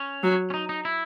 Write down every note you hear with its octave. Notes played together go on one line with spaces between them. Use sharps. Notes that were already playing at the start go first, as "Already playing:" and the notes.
Already playing: C#4
F#3
C#4
D#4
D#4
E4